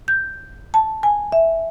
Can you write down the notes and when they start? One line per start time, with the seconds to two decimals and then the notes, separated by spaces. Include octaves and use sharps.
0.08 G6
0.74 A5
1.03 G#5
1.32 E5